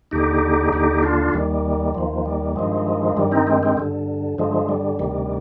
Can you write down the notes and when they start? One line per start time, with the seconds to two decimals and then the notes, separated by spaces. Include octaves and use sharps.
0.11 D#2 D3 D#4 G4
0.72 D#2 D3 D#4 G4
1.03 D4 F4
1.34 D#2 D#3 G3
1.94 D#2 D#3 F3
2.26 G3
2.56 G2 D#3 F3 G#3
3.17 G2 D#3 G3
3.32 C4 D#4
3.47 G#3 C4
3.63 G#3 C4
3.77 G2 D3
4.38 G2 D3 F3 G#3
4.69 G3
4.99 D2 C3 D#3 G3